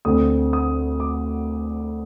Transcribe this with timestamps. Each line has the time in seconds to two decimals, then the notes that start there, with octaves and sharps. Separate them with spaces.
0.05 D2 D3 A3 C4 D#6
0.53 D#6
1.00 D6